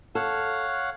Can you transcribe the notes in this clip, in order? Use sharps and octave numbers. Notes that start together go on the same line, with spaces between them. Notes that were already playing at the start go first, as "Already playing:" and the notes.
A4 C#5 F5 F#5